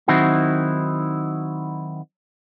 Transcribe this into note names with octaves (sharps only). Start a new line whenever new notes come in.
D#3 F#3 C4 D#4 E4 F#4